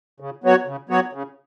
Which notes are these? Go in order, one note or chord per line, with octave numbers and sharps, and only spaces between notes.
C#3
F#3 B3 F#4 C#5
C#3
F#3 B3 F#4 C#5
C#3